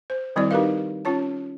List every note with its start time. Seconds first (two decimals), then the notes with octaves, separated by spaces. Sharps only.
0.10 C5
0.36 D#3 G3 C4 E4 F#4 D5
0.51 D#4 F#4 G4 A#4 B4 F5
1.05 C#4 F4 C#5 A5